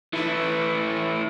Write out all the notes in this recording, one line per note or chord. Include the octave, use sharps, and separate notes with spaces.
E3 A3 E4